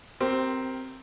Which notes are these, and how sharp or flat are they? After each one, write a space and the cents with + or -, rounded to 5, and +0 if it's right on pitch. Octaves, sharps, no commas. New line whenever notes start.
C4 +0 G4 -25 A#4 +0